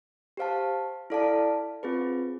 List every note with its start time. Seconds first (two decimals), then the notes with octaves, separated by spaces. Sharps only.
0.37 G4 C5 F5 A5
1.10 E4 A4 D5 F5 A5
1.83 C4 F4 G#4 B4